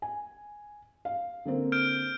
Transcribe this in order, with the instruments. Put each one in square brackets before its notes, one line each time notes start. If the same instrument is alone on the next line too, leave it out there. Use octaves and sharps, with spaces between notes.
[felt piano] G#5
F5
D3 A#3 C4
[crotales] F6 G6 D7